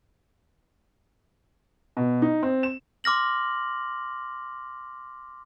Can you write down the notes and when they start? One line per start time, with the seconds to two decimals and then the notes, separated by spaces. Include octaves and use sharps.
1.97 B2
2.22 D#4
2.43 C4
2.63 E7
3.04 C6 D6 F6 A#6 F#7